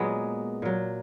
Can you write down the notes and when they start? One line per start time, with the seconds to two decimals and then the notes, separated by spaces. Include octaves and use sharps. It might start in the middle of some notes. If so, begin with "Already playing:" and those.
Already playing: A#2 F#3 G#3 B3
0.62 A#2 F#3